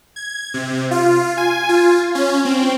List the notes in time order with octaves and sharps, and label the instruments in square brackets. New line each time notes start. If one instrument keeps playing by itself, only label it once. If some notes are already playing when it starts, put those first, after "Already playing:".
[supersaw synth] G#6
C3
F4
G#5
F4
C#4
C4